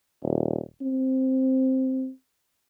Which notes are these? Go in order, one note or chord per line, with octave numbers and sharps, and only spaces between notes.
D#1
C4